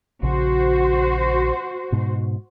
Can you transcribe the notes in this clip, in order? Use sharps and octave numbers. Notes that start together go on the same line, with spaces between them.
A#1 C#3 F#4 C5
G#2 B2